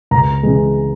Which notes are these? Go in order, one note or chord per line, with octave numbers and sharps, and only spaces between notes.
C#2 A#5
C#3 E3 G#3